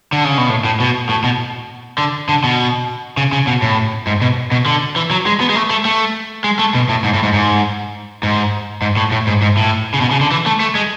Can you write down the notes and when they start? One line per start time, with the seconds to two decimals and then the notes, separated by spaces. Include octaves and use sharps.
0.13 D3
0.25 C#3
0.38 B2
0.49 A2
0.65 A2
0.80 B2
1.09 A2
1.24 B2
1.98 D3
2.29 D3
2.44 B2
3.17 C#3
3.32 C#3
3.47 B2
3.62 A2
4.07 G#2
4.22 B2
4.52 B2
4.66 D3
4.96 E3
5.11 F#3
5.26 G#3
5.40 B3
5.49 G#3
5.55 A3
5.70 A3
5.85 A3
6.44 G#3
6.59 A3
6.74 B2
6.89 A2
7.04 G#2
7.14 A2
7.23 G#2
7.33 G#2
8.23 G#2
8.82 G#2
8.97 A2
9.12 A2
9.27 G#2
9.42 G#2
9.57 A2
9.94 C#3
10.01 B2
10.11 C#3
10.21 D3
10.31 E3
10.46 A3
10.60 A3
10.75 G#3